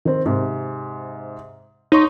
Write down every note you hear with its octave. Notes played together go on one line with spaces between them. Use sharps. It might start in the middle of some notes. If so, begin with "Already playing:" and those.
D#3 C4
G#2 C3
D#4 C#5 C6 C#6